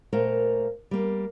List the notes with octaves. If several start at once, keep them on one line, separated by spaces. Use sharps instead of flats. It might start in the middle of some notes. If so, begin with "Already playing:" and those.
A#2 A3 A#4 C5 F5
G3 A#3